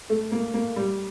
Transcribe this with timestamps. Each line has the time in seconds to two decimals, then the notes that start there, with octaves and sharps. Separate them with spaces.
0.09 A3
0.32 A#3
0.54 A#3
0.76 G3